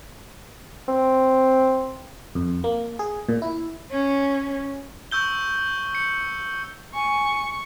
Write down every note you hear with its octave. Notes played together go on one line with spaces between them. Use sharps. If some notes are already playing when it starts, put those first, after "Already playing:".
C4
F2
A#3
G#4
A#2
E4
C#4
C#6 E6 G6 G7
C#7
G#5 C#6